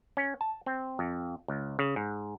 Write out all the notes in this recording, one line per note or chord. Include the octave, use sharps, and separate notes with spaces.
C#4
A5
C4
F2
C#2
C#3
G#2